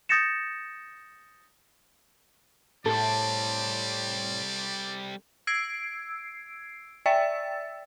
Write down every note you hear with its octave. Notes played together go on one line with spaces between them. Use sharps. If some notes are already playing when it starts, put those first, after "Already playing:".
D#6 G6 A6 A#6 C#7 E7
A2 G3 C4 A4 D5
E6 G#6 C7 D7
D5 E5 G5 E6 A6